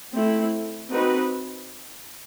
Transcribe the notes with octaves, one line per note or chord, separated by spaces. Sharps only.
A3 C4 E4
C4 D#4 F#4 B4